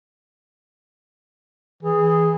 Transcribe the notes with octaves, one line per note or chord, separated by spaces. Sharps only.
E3 G#4